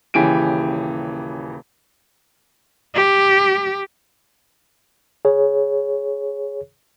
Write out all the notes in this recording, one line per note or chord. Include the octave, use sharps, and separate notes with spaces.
D#1 C#3 E3 G4 G#5 D7
G4
G#4 C#5